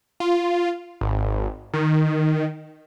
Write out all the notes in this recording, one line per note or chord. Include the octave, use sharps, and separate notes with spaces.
F4
G#1
D#3